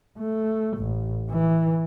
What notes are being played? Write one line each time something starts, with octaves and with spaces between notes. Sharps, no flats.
A3
A1
E3